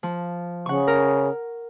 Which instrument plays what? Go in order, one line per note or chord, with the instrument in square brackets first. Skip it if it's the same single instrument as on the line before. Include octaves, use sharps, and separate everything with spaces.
[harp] F3
[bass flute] C#3 [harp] F#5 C#6
[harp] A#4